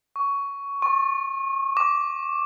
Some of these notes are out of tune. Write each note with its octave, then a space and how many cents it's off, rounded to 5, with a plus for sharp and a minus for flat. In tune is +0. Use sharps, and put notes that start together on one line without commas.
C#6 +15
C#6 -35
D6 -15